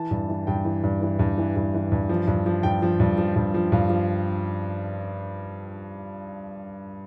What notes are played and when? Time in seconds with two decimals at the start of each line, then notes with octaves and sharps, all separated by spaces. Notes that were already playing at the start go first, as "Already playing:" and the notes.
Already playing: E3 A5
0.11 G2
0.29 E3
0.47 G2 G5
0.65 E3
0.84 G2
1.02 E3
1.19 G2
1.38 E3
1.56 G2
1.74 E3
1.92 G2
2.09 F3
2.27 G2
2.46 F3
2.63 G2 G5
2.82 F3
3.00 G2
3.18 F3
3.36 G2
3.54 F3
3.72 G2 F5
3.90 F3